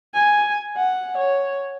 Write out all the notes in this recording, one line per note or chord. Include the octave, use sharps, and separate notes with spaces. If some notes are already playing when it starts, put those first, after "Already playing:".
G#5
F#5
C#5